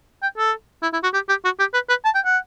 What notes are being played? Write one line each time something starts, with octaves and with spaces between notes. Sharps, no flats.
G5
A4
E4
E4
F#4
G4
G4
F#4
G4
B4
B4
A5
G5
F#5